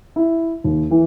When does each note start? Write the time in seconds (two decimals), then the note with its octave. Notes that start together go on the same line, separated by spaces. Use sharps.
0.16 E4
0.64 D#2
0.91 E3